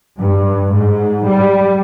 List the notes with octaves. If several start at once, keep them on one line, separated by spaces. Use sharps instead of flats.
G2
G#2
G3